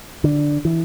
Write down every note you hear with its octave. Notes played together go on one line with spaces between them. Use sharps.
D3
E3